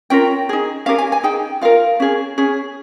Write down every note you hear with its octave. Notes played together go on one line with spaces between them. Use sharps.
C#4 F4 A#4 G5
D#4 G#4
C#4 G4 A#4 F5
G#5
G#5
D#4 G#4 G5
F4 A#4 F5
C#4 G#4
C#4 G#4